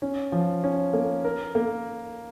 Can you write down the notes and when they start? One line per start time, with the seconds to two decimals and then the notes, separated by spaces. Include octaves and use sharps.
0.02 C#4
0.32 F3
0.64 C#4
0.93 A#3
1.24 A#4
1.55 A#3